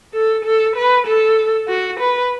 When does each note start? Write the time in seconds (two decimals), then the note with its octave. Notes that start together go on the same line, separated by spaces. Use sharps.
0.14 A4
0.45 A4
0.76 B4
1.07 A4
1.68 F#4
2.00 B4